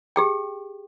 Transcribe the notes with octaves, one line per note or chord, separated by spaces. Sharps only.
G4 G#4 G5